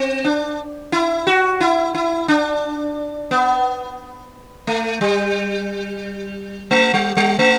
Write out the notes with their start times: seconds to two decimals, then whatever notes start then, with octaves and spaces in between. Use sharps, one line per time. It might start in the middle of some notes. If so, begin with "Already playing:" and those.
Already playing: C4
0.24 D4
0.92 E4
1.27 F#4
1.60 E4
1.95 E4
2.28 D4
3.31 B3
4.67 A3
5.01 G3
6.71 A3
6.94 G3
7.17 G3
7.39 A3